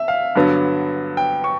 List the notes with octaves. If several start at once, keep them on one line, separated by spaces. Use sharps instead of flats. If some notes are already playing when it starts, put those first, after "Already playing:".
Already playing: E5
F5
G2 D3 F#3 B3
G5
C#6